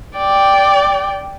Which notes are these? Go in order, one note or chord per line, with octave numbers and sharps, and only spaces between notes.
D5 G5